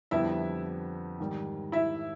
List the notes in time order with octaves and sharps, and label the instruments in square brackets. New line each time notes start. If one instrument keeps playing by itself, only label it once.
[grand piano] F2 D3 G3 B3 [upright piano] E4 E5
[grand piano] G#2 D#3 G3
[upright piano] E4 E5